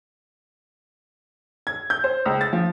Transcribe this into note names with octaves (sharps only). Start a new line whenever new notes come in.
G#6
G6
C5
C#2
A6
F3